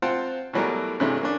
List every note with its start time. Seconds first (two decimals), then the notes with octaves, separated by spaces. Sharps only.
0.02 C4 F4 C5 F#5 G5 A5
0.54 B2 E3 F#3 G3 A3 A#4
1.00 G2 C3 E3 F#3 G#3 A3
1.21 A#3 C#4 D4